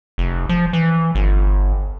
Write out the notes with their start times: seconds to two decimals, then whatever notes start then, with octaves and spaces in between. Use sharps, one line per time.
0.18 F1
0.49 F3
0.73 E3
1.15 G1